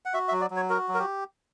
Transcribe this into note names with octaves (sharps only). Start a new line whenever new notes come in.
F#5
F#4 E5
E5
F#3
D5
F#3
C#5
F#4 A#4
F#3
A#4
G4